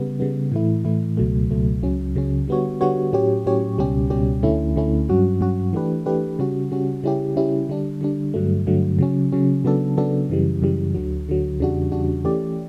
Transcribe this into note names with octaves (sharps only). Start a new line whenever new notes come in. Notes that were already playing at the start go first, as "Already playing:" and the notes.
Already playing: C#3 G3 B3
C#3 G3 B3
A2 E3 A3 E4
A2 E3 A3 E4
C#2 B2 F#3 A3
C#2 B2 F#3 A3
C#2 C#3 F#3 C#4
C#2 C#3 F#3 C#4
D3 G3 B3 F#4 C#5
D3 G3 B3 F#4 C#5
A2 F#3 C#4 G4 C#5
A2 F#3 C#4 G4 C#5
C#2 B2 G3 C#4 G4
C#2 B2 G3 C#4 G4
D2 D3 A3 C#4 E4
D2 D3 A3 C#4 E4
G2 F#3 C#4 F#4
G2 F#3 C#4 F#4
E3 A3 D4 G4 B4
E3 A3 D4 G4 B4
C#3 G3 C#4 F#4
C#3 G3 C#4 F#4
C#3 G3 C#4 E4 G4
C#3 G3 C#4 E4 G4
D3 G3 D4
D3 G3 D4
G2 D3 F#3 A3
G2 D3 F#3 A3
C#3 F#3 C#4
C#3 F#3 C#4
C#3 F#3 B3 D4 A4
C#3 F#3 B3 D4 A4
F#2 C#3 E3 G3
F#2 C#3 E3 G3
D2 D3 F#3
D2 D3 F#3
E2 C#3 G3 D4 F#4
E2 C#3 G3 D4 F#4
E3 A3 C#4 G4 D5